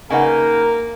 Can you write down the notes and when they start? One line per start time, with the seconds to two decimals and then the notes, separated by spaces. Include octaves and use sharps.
0.10 C#3 A#3 D#4 A#4 B4 F#5 G#5